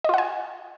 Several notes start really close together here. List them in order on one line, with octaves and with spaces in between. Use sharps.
D#5 F4 F#5 G#5